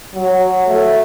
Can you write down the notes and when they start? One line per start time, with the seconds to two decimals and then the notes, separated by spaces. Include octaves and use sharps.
0.15 F#3
0.68 A3